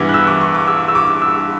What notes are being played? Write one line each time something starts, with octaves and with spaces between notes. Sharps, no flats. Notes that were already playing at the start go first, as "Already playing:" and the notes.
Already playing: G2 E3 B3 E4 D6
F#6
E6
D6
C#6
D6
E6
E6
D6
E6